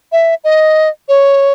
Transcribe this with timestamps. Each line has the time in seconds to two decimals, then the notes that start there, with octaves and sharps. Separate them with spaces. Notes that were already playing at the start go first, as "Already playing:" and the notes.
0.12 E5
0.44 D#5
1.08 C#5